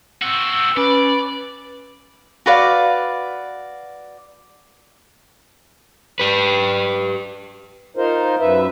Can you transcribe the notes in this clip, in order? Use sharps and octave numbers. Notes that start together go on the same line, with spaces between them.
C4 F#4 E6
C#4 B4 D5
F#4 B4 D5 F5
G4 B4
D#4 F4 A#4 C5
F#2 B4 E5